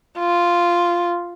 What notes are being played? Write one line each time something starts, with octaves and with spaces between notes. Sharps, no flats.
F4